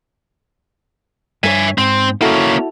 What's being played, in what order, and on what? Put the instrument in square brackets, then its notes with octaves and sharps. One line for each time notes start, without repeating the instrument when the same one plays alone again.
[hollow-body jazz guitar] G2 A#4 C#5 [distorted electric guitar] E5 G#5
[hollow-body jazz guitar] G#2 [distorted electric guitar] C4
[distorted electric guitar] A#3 C#4 [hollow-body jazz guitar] E4 F#4 A4